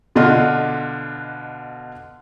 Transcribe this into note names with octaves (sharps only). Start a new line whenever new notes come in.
B2 D3 D4 F4 D#5 C6